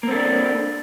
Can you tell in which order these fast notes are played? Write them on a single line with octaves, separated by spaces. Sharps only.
A#3 C4 A4 D4